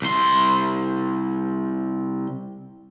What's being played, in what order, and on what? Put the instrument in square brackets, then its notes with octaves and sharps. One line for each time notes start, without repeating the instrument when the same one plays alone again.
[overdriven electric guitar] C2 C6